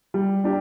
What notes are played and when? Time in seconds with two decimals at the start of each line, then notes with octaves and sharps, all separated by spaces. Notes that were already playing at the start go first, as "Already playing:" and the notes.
0.14 G3
0.44 D4 G4